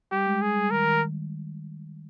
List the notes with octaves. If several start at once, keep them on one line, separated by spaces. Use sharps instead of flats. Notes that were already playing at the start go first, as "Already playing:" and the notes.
G3 G4
G#3
G#3 G#4
G3
D#3 A#4
D#3